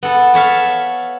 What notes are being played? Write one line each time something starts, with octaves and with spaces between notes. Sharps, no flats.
B3 A4
A4 C#5 E5 F5